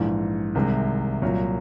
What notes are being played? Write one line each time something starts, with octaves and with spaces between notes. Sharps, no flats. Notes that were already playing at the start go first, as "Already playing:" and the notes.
Already playing: A#1 G#2 E3
C2 C3 D#3 G#3
C2 A#2 F#3